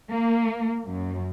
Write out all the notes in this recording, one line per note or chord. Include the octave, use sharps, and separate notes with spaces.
A#3
F#2